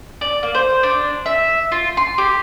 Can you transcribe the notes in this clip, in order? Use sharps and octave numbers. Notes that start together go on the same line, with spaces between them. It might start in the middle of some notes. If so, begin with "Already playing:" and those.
D5
A#3
C5
D4
E5
F4
C6
G4